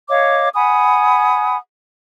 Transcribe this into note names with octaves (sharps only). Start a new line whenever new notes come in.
C#5 D#5 F5 D6
F#5 G#5 B5 D#6